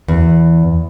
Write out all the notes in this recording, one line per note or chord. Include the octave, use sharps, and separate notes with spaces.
E2